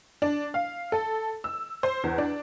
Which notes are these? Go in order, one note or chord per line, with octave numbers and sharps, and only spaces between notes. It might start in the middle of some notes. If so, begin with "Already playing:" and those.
D4
F5
A4
E6
C5
E2
D4